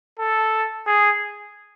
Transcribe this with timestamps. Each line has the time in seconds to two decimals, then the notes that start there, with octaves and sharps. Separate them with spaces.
0.19 A4
0.86 G#4